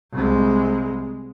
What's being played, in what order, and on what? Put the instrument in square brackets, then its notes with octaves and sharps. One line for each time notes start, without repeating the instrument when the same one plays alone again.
[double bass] C2 G#3